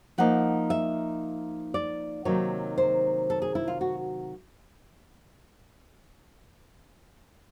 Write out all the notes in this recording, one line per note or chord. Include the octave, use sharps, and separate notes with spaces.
F3 A#3 D#4 F#5
E5
D5
C3 D#3 F#3 A#3 D#4 C#5
C5
A4
G#4
E4
F4
F#4